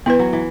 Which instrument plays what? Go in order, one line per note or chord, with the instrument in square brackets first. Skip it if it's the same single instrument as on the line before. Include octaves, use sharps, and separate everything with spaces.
[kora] E3 [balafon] B3 E4 B4
[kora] F#3
E3